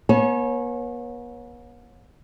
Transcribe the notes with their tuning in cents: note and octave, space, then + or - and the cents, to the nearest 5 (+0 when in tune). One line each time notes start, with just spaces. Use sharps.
B3 -45 C#5 -25 G#5 +40